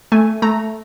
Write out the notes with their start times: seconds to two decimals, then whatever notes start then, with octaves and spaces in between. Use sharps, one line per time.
0.12 A3 G#5
0.42 A3 A#5